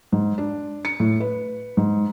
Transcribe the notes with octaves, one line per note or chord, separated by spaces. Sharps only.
G#2
D4
C#7
A2
B4
G#2